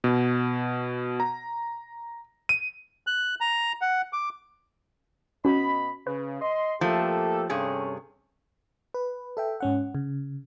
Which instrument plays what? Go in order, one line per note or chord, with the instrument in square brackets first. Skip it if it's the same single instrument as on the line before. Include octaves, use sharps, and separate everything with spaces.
[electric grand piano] B2
A#5
D#7
[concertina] F#6
A#5
F#5
D6
[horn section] B2 D#5 B5 [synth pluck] C#4 F#4
[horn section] C#3 [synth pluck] B4
[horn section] D#5 C6
[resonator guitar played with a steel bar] F3 A3 [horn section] A#3 G4 A4
[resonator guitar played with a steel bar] G2 C3 G#4 [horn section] C#4 A4 C#5
[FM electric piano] B4
A4 E5 G5
G#2 C#4 F#5
C#3